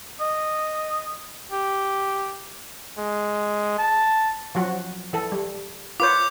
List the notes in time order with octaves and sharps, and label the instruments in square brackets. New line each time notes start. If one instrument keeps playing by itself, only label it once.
[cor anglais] D#5
G4
[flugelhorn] G#3
A5
[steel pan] F3 F#3 F#4
E3 A4
G3
[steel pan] F4 B4 C#5 [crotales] D6 G6